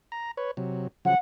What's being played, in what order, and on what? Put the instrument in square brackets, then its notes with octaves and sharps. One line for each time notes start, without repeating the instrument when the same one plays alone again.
[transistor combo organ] A#5
B4 C#5
C3 F#3
[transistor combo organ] C#3 F3 F#3 [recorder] F#5